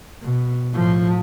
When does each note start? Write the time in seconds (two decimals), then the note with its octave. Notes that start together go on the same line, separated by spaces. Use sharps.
0.22 B2
0.73 A2 F3